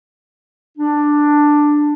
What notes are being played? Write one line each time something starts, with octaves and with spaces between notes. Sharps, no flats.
D4